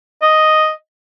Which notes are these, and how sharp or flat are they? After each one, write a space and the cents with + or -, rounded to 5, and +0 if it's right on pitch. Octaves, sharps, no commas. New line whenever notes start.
D#5 +0